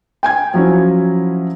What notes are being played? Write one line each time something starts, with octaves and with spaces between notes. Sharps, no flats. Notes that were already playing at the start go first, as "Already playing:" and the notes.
G5 G#5 G#6
F3 F#3 C#4 E4